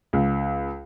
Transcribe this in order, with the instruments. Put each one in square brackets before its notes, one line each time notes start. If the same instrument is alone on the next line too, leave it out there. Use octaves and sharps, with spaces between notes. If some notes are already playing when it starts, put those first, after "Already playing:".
[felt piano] C#2